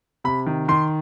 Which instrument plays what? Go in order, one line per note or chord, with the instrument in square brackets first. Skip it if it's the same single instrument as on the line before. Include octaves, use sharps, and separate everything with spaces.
[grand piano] C3 B5
D#3
D#3 C6